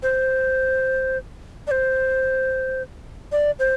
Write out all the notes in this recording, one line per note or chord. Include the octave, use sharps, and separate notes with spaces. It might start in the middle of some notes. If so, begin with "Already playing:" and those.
C5
D5
C5
D5
C5